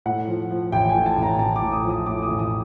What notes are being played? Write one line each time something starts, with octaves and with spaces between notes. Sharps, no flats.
A2 F#5
F3
F3
A1 G5
G#5
A2
A5
A1 A#5
A1 A5
D6
A2
D#6
F3
D#6
A2 D6
D#6
A1
D#6